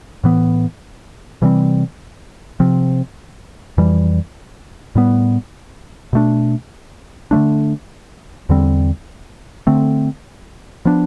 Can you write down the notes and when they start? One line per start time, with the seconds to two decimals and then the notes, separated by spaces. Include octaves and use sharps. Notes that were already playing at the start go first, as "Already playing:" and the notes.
0.24 A2 E3 B3
1.42 C3 E3 G3 C4
2.60 C3 F3 C4
3.78 F2 E3 G3
4.95 A2 G3 B3
6.13 B2 A3 D4
7.31 D3 F3 A3 D4
8.49 E2 D3 G3 C4
9.67 D3 A3 C4
10.85 F3 B3 D4